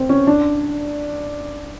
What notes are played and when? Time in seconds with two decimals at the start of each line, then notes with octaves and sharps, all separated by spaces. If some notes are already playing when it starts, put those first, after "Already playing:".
Already playing: C4
0.09 C#4
0.27 D4